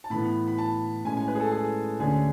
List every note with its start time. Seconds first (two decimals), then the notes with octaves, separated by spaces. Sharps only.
0.04 A5
0.10 A2 E3 B3 B5
0.48 B5
0.58 A5
1.05 A2 G#3 C#4 G#5
1.17 G#5
1.28 B4
1.35 G#4
1.40 A4
1.52 G#4
1.99 D2 D3 A3 C#4 G#4